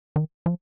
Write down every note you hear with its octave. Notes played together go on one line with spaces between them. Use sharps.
D#3
F3